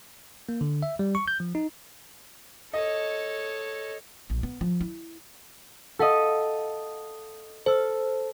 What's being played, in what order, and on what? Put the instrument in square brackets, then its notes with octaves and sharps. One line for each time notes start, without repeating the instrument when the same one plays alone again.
[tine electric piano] A#3
D3
E5
G3
C#6
G6
F3
D#4
[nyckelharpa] A4 C#5 [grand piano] D#5
[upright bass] A#1
B3
F3
E4
[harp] A4 D#5 [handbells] F5 F#5 E6
[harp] A4 [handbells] C5 E6